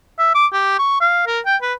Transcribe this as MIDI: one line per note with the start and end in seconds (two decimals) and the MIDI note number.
0.19 0.34 76
0.35 0.46 86
0.53 0.78 67
0.79 0.98 85
1.01 1.24 77
1.27 1.40 70
1.46 1.56 79
1.62 1.73 71